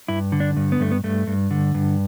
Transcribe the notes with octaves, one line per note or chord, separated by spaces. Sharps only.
G2 E4
D3
D4
G2
B3
G2 A3
B3
G2 A3
G2
D3
G2